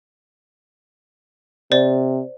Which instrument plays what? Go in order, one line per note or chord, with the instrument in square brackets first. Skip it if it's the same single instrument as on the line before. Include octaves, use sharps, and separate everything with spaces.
[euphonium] C3 [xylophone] C5 D5